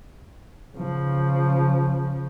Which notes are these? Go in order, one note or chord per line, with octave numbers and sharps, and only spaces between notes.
C#3 F3